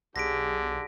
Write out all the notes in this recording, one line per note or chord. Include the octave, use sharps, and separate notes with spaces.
B1 D3 G4 G#4 A#6 B6 D7